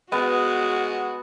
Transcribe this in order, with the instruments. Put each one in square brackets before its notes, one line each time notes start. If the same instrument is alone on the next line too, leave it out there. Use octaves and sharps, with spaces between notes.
[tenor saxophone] G#3 [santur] B3 [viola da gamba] F#4